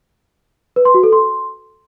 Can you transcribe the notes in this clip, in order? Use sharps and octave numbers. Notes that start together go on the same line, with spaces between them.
B4
C6
F#4
A4
C6